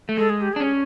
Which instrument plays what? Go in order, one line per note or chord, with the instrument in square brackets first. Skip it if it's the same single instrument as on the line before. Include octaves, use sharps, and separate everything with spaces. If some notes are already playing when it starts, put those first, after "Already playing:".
[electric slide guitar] A3
[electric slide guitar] G#3 [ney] A4
[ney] G#4
G4
[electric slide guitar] D4 [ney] G#4
[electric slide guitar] C#4